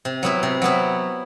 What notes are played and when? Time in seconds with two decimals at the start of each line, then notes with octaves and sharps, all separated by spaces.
0.05 C3
0.23 F#3 B3 E4
0.43 C3
0.62 F#3 B3 E4